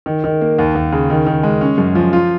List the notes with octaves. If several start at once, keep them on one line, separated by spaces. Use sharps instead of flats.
D#3
D#3
A#3
D#2
D#2
C#3
D#3
D#3
G#3
C#4
F#2
F3
F4